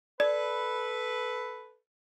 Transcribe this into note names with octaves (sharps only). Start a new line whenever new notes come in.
A4 B4 D5